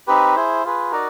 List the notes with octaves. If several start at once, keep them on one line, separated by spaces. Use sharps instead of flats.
C4 D#4 G4 B4
E4 G#4 C5
F4 G#4 B4
D#4 F#4 A#4 D5